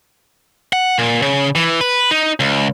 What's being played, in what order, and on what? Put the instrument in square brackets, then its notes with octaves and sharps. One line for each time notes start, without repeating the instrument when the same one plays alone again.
[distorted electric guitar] F#5
A#2
C#3
E3
B4
D#4
C#2